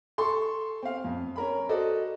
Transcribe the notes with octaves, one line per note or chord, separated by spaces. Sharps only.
A4 C6 C#6
C4 F5
F2
C#4 A#4 B5
F#4 A4 C5 D5 D#5